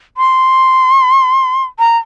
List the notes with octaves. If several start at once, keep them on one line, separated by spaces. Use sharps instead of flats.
C6
A#5